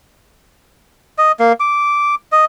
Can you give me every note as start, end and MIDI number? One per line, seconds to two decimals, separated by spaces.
1.18 1.32 75
1.39 1.53 58
1.60 2.15 86
2.32 2.45 75